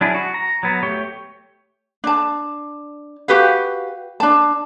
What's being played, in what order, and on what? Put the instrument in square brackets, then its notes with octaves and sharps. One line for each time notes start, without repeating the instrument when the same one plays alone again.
[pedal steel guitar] F#3 D4 E4 G#4
F#4
A#5
F#3 B3
A3 G4 C#5
[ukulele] D4 A5
F#4 G4 B4 F5
D4 A5